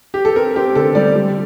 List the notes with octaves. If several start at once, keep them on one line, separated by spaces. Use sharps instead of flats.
G4
A4
C4 A#4
C4 G4
D3 A4
G3 D5
G3